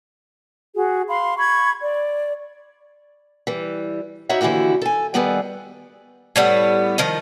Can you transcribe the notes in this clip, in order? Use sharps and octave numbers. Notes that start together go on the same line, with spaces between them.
F#4 G#4
F5 B5 C6
B5 C#6 G#6
D5
E3 G3
D#4 E4 F#4 C#5 E5
D#2 D3 E3 E4 F#4 G4
A4 G#5
D#3 G3 B3 G#4 A4 D5
A2 G3 B3
D#3 F3 D#5